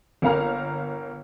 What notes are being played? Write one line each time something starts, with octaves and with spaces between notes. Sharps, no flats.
G1 A#3 F5 A#5 F6